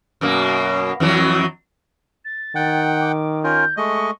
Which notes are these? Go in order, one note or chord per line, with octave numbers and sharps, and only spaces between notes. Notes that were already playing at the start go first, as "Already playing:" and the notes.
F#2 B2 A#3
F2 E3 F#3
A6
D#3 F#5 G5
D6
C#4 F4 A#4 G6
G#3 A3 D#5 C#6